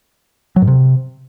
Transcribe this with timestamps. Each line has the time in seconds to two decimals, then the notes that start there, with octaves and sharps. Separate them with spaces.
0.56 F#3
0.62 G#2
0.67 C3